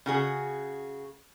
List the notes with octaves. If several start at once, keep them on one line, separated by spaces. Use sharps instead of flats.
C#3 F#4 G#4